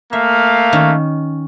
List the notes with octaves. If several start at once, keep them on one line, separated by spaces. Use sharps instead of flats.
A3 A#3 E5 F5
D#3 C#4 D#4